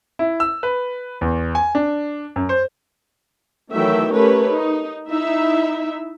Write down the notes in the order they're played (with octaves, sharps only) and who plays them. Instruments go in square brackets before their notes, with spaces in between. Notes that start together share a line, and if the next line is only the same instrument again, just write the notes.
[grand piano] E4
E6
B4
E2
G#5
D4
F#2
C5
[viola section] D#3 E3 F#3 A3 E5 G5
A3 C#4 G4 A#4 B4 C#5
D#4
D#4 E4 E5